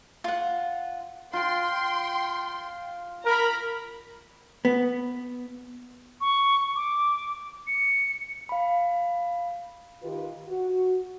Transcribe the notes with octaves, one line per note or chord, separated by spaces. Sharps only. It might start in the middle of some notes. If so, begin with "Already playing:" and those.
F4 F#5
F4 G5 C6
A#4 A#5 B5
B3
C#6
D6
C#7
F5 B5
D#3 D#4 F4 G4 B4
F#4